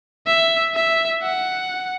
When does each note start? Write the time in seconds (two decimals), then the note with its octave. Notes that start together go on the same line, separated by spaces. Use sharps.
0.27 E5
0.75 E5
1.23 F#5